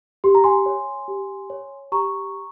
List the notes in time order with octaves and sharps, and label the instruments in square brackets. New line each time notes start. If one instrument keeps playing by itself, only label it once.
[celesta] G4 C6
A#5
G#5 C6
C#5
G4
C#5
G4 A#5 C#6